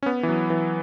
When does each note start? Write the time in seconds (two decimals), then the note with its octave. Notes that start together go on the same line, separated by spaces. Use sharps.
0.03 C#4
0.06 B3
0.23 E3
0.29 F#3
0.50 E3